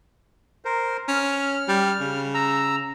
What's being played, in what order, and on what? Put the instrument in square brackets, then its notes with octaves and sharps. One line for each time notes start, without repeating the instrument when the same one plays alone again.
[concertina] A#4 C5
[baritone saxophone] C#4 [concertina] F6
[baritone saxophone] G3
C#3
[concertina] A#5 E6